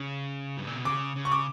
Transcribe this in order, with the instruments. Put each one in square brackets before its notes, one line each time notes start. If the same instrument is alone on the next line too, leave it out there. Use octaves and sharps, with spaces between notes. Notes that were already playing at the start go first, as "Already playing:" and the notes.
Already playing: [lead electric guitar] C#3
G2
A#2
B2
[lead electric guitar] C#3 [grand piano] D6
[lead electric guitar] C#3
[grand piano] C#6
D6